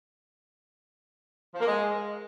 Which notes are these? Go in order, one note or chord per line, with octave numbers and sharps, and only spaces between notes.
F3
A#3
G#3